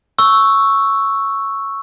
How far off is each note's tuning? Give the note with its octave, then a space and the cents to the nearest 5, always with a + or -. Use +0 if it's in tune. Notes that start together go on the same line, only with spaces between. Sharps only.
C#6 +0 E6 +0